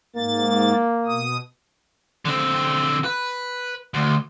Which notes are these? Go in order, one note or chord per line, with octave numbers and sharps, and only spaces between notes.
G#2 A#3 A6
B2 D#6
D3 C4
B4
D2